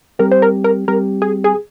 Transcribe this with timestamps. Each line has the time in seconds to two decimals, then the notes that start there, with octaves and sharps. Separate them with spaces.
0.19 G3 C4 G4 A#4
0.32 C5
0.42 A#4
0.64 A#4
0.88 G3 C4 G4 A#4
1.22 G#4
1.44 G#4